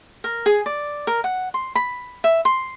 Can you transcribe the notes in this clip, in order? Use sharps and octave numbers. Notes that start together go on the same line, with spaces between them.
A#4
G#4
D5
A#4
F#5
C6
B5
E5
C6